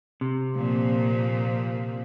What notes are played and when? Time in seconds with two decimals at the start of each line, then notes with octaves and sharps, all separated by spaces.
0.21 C3
0.53 A#2 F3